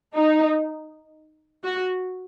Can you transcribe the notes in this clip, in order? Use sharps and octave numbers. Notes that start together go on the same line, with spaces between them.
D#4
F#4